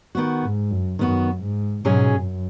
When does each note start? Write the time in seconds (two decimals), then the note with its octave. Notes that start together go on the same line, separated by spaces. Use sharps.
0.15 D#3 B3 F#4
0.42 G#2
0.71 F#2
0.99 F#2 D#3 B3 F#4
1.42 G#2
1.84 G#2 B2 F#3 C#4 G#4
2.13 F#2